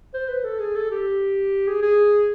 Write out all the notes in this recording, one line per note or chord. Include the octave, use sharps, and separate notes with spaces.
C5
B4
A4
G#4
A4
G4
G#4
G#4